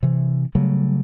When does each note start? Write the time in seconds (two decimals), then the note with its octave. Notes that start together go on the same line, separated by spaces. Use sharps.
0.03 C3 E3
0.55 C#3 F#3 G3 A3